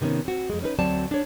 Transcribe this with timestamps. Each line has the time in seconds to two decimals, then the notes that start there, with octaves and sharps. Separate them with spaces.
0.01 C3 D#3 B3 C#4
0.25 C4 F#4
0.50 F2 G#3
0.62 C#4 D#4 B4
0.79 D2 F#3 C4 D5 A5
1.11 D4 C#5